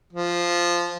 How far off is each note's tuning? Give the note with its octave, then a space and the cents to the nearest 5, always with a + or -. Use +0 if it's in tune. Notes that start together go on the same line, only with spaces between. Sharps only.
F3 -5